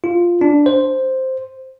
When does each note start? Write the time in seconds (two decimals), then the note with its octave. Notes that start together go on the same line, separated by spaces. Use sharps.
0.04 F4
0.41 D4
0.66 C5